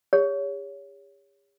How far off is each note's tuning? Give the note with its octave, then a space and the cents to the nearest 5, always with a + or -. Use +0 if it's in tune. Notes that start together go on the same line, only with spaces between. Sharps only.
G4 +45 C#5 +20